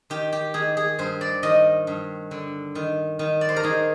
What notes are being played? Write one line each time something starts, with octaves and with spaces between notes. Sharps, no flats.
D#3 G4
G4
D#3 G#4
G#4
G2 C5
D5
D#3 D#5
G2
D3
D#3
D#3
D5
C5
A#4
D#3 G#4